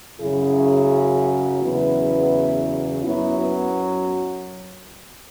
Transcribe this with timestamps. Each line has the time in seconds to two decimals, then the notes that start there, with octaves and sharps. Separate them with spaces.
0.21 F#2 C#3 F#3 E4 G#4
1.62 E2 C#3 F#3 B3 E4
3.04 F#2 F#3 B3 E4
3.39 B3